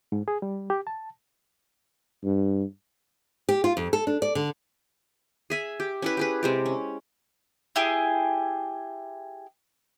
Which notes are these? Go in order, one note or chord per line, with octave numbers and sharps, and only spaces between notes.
G#2
G#4
G3
G4
A5
G2
G4
F4
F2
A4
D4
D5
D3
G#4 E5 G#5
G4
C#4 E4 B4
G4 G#4 B4
C3 G#3 G4
C#4
E4 G4 G#4